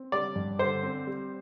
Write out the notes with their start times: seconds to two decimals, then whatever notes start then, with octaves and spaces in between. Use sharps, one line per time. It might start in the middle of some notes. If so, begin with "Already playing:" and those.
Already playing: C4
0.12 G3 D5
0.36 G2
0.59 D3 C5
0.83 C4
1.07 G3